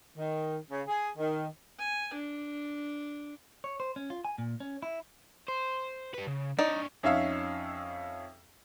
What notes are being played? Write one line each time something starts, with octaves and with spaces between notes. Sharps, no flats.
D#3
C#3
G#4
D#3
G#5
D4
C#5
C5
C#4
F4
G#5
A#2
C#4
E4
C5
G3 B4
C#3
D4 D#4 C#5 D5
F2 C#4 D#4 E5 F5